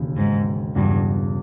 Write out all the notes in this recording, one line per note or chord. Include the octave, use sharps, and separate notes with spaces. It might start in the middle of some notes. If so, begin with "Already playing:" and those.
Already playing: E1 D#2 C#3
G#2
E1 E2 G2 C#3